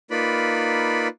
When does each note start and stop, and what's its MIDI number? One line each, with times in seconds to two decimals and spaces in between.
0.11 1.08 58
0.11 1.08 63
0.11 1.08 65
0.11 1.08 71
0.11 1.08 74
0.11 1.08 83